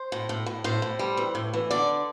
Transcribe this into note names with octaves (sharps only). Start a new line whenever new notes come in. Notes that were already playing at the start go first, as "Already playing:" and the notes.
Already playing: C5
A2
A2
A2
A2 C5
A2
G3
E3
A2
E3
D3 D5